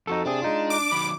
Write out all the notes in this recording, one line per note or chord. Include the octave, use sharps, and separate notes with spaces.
F2 D#4 F#4 A4
C3 C4 D4 G#4
G#3 D#4 F4
D6
D#3 F#3 B5